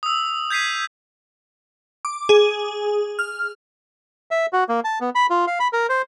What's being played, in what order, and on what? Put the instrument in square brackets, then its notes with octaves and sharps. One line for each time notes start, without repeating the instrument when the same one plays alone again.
[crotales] D#6 E6
G6 G#6 B6 C7 D#7
[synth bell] D6
G#4
F6
[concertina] E5
F#4
A#3
A5
B3
B5
F4
F5
B5
A#4
C5